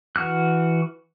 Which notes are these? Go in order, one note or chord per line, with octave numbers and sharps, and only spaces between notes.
E3 F#4 F6 F#6